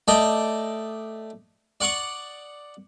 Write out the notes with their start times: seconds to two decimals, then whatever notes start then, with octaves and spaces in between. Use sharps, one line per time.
0.08 A3 D5 D#5 G5
1.81 D5 F#5 C#6 D#6